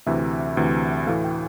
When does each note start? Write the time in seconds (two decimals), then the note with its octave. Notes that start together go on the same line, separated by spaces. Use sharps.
0.06 D2 C3 E3 E5
0.57 D2 C3 E3
1.07 A2 E3 A3 F5
1.24 G5